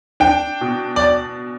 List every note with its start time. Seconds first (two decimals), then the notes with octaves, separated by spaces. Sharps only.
0.20 D4 G5
0.61 B2
0.96 D5